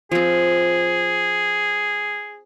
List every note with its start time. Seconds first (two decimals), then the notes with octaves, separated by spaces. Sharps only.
0.12 F3 C4 G#4